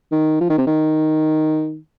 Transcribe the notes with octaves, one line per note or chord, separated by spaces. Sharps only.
D#3
F3
D#3
C3
D#3